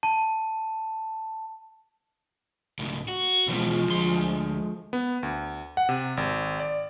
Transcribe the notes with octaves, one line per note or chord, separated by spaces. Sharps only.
A5
C#2 A2
F#4
B2 E3 F3 G#3
D2 C6
B3
D2
F#5
C3
G#1
D5